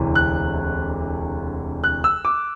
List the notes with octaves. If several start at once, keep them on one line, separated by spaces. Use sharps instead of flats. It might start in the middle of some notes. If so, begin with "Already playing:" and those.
Already playing: E1 D2 C3 E3
F#6
F#6
E6
D6